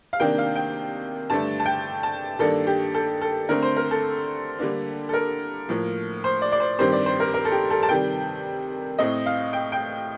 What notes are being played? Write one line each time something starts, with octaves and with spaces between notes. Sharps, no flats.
F5
C3 D#3 A#3 D4 G5
F5
G5
G2 D3 A3 A5
A5
G5
A5
G2 D#3 A#3 D4 A4
G4
A4
A4
D3 A3 C4 A#4
C5
A#4
A4
D3 G3 A#3 D4
A4
A#4
A2 F3 A#3
C5
D5
D5
C5
G2 D#3 G3 C4 C5
D5
C5
A#4
A#4
A4
G4
A4
A5
C3 D#3 G3 G5
A2 A3 C4 D#5
F5
G5
G5